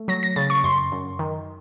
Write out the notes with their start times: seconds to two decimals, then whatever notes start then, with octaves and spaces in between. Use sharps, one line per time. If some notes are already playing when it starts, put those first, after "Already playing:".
Already playing: A3
0.08 F#3 A#6
0.23 A#6
0.36 C#3 A6
0.50 C#6
0.64 F#2 C6
0.92 F#2
1.19 D#3